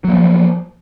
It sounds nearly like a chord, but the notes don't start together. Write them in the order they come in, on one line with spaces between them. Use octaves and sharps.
F#3 A#3 F3